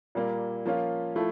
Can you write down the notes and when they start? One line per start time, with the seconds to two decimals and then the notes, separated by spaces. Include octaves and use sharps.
0.15 A#2 G3 A#3
0.66 F3 A#3 C#4 F4
1.16 F3 A3 E4